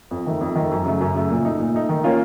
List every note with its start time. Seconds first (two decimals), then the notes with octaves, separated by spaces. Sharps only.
0.11 F2
0.26 D#3 A3
0.41 F2
0.56 D#3 A3
0.71 F#2
0.85 C#3 F#3 A3
1.01 F#2
1.16 C#3 F#3 A3
1.30 A#2
1.45 A3 D#4
1.59 A#2
1.75 A3 D#4
1.89 D#3
2.04 A#3 C#4 F4